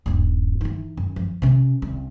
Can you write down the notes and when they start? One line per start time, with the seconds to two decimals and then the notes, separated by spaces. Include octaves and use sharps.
0.06 D#1 G2
0.61 E3 D#4
0.97 F#2
1.16 F3
1.42 C3 C#4
1.82 C2 C#4